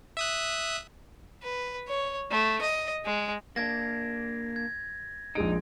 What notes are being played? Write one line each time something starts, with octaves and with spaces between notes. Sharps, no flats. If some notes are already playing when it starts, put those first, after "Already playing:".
E5 D#6 F#6
B4
C#5
A3
D#5
G#3
A#3 D4 G#6 A#6
G#6
A#1 G#3 D#4 D7